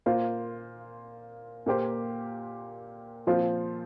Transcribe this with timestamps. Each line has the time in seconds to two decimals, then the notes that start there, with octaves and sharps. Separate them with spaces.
0.06 A#2 A#3 F4 C5
1.66 A#2 A#3 G4 C5
3.27 A#2 F3 C4 F4 C5